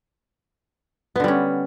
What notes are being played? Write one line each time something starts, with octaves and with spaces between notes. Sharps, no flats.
D3 G3 B3 C#4